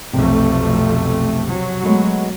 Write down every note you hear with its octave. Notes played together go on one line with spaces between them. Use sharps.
B1 F2 C3 A3
F#3
G#3 A3 B3